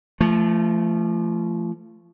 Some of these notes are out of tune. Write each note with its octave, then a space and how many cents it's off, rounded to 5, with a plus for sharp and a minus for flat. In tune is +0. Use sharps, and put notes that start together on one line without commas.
F3 -30 A3 +0